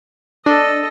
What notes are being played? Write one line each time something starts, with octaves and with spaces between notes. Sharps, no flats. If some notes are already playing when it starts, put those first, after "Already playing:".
D4 A4 D#5